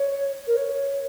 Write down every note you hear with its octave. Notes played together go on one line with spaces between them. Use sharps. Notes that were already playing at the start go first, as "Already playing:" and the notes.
Already playing: C#5
A#4
C#5